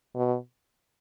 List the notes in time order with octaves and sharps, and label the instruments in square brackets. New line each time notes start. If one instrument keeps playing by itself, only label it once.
[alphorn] B2